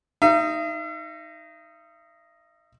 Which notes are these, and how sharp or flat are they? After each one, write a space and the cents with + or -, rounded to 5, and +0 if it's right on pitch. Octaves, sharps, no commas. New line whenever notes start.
D#4 +0 E5 +45